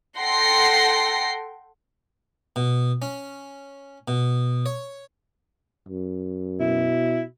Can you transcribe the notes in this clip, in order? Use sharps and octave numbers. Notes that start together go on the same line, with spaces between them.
A4 F#5 G5 C6 A#6 C7
B2
C#4
B2
C#5
F#2
B2 E4